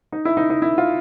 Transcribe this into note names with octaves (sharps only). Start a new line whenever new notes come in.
D#4
E4
D#4
D#4
E4
F4